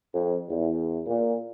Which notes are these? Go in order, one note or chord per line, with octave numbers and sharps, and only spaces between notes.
F2
E2
A#2